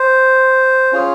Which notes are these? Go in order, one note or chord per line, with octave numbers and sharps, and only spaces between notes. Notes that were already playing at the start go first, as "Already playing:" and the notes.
Already playing: C5
C#4 F4 G#4